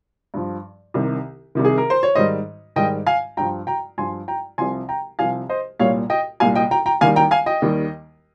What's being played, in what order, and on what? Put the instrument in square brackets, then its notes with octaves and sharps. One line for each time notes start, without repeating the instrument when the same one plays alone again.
[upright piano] G2 F3
C2 C3 D#3
C2 C3 D#3
G#4
A#4
C5
C#5
G#2 D#3 G3 C5 D#5
G#2 D#3 G3 D#5 G5
F5 G#5
G2 F3 G5 A#5
G5 A#5
G2 F3 G#5 C6
G5 A#5
C2 C3 F3 G#5 C6
G5 A#5
C2 C3 F3 F5 G#5
C5 D#5
C2 A#2 G3 C#5 F5
D#5 G5
C2 A#2 G3 F5 G#5
D#5 G5
G5 A#5
G5 A#5
D#2 D#3 G3 F5 G#5
G5 A#5
F5 G#5
D#5 G5
D#2 D#3 G3